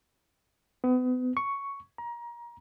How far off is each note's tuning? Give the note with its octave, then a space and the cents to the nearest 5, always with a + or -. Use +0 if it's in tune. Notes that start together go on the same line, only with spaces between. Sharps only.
B3 +35
C#6 +5
A#5 +25